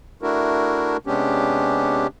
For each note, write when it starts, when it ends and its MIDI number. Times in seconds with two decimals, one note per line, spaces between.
0.22 0.97 57
0.22 0.97 62
0.22 0.97 64
0.22 0.97 66
0.22 0.97 70
1.07 2.07 48
1.07 2.07 56
1.07 2.07 59
1.07 2.07 61
1.07 2.07 62
1.07 2.07 67